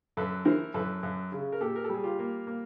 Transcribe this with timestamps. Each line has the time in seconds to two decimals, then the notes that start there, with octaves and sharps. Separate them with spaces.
0.17 F#2 A4 B4
0.45 E3 A#4 C5
0.74 F#2 A4 B4
1.03 F#2
1.32 C#3
1.52 A#4
1.61 A#2 G4 A4
1.76 A#4
1.84 A4
1.89 G3 G#4
2.04 F4 G4
2.19 A#3
2.47 A#3